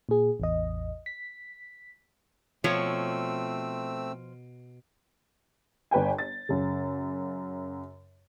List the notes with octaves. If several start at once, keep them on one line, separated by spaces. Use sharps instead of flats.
A#2 G#4
A1 E2 D#5
B6
B2 F3 A3 C4 C#5 E6
G1 B4 G5 G#5
A6
F#2 C#3